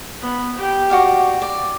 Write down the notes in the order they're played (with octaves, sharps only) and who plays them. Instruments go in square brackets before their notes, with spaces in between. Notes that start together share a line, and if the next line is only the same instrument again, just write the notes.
[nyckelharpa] B3
G4 G5
[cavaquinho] F#4 D5 F5
D5